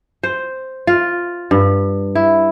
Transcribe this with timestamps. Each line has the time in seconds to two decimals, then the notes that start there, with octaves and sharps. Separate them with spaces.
0.23 C5
0.87 F4
1.51 G2
2.15 E4